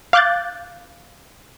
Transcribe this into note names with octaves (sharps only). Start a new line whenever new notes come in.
F5 D6 F#6 G6 A6